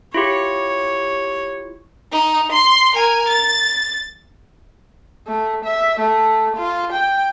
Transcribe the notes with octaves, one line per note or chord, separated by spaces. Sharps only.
E4 F4 G4 C#5
D#4
C6 C7
A#4 G#5
A6
A3
E5
A3
F4
G5